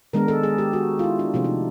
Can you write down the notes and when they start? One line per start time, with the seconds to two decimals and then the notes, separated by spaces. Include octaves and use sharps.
0.13 D#3 G#3 B3 D4 A#4
0.28 A4
0.43 G#4
0.58 G4
0.73 F#4
0.99 F4
1.04 E4
1.19 D4
1.34 C3 F3 A3 C4 D4
1.44 D#4